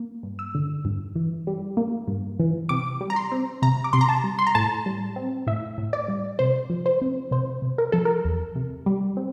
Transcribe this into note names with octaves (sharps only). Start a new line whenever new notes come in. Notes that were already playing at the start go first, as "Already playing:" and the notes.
Already playing: A#3
G2
E6
D3
G2
E3
G3
A#3
G2
E3
C3 D6
G3
A#5
C6
C4
C3 A#5
D6
C3 C6
A#5
A5
G3
C6
A#5
A2 A5
G3
C4
A2 E5
A2
D5
G3
C3 C5
F3
C5
C4
C3 C5
C3
A#4
F3 A4
A#4
E2
C3
G3
C4